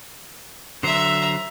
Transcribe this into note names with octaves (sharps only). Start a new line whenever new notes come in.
D3 F#3 C5 E5 A#5